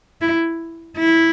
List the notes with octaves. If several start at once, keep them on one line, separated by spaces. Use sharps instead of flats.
E4
E4